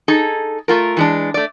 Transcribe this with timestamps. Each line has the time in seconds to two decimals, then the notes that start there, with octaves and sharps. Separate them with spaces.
0.08 D#4 G#4 A4
0.68 A3 F4 A#4
0.97 E3 G#3 D4
1.34 A3 D5